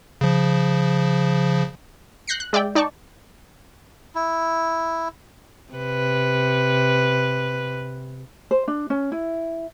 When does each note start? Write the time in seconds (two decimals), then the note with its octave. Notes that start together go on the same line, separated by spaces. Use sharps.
0.21 C#3 F3
2.28 F#6 G6 A#6 C7 C#7
2.40 F#6
2.53 G#3 D5 E5 G5
2.75 D#4 D5 G5 A5 C#6
4.15 E4
5.73 C3 B4
8.51 C5
8.68 D4
8.90 C#4
9.12 E4